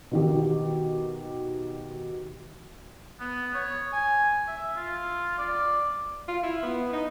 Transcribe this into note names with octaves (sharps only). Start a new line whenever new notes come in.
B2 D#3 G4
B3
C#5
G#5
E5
F4
D5
F4
E4
B3
D#4